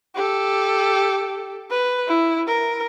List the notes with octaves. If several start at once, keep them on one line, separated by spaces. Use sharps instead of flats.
G4 A4
B4
E4
A#4